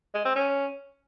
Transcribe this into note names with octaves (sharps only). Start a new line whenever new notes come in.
G#3
C4
C#4